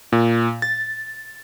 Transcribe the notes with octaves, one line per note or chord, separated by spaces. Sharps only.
A#2
A6